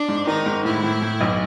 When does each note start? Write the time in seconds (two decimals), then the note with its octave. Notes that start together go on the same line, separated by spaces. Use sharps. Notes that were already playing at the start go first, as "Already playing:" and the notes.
Already playing: D4
0.08 G#2
0.27 D#3 D#4
0.46 G#2
0.65 A2 E4
0.83 A2
1.01 A2
1.21 B1